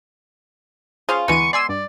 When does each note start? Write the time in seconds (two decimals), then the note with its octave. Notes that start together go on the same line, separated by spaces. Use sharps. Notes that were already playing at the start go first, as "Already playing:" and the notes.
1.09 C#4 F4 G#4 C5 F5
1.28 D2 E3 G#3 B3 C#6 D#7
1.53 D5 G#5 C6 E6
1.69 G2 D5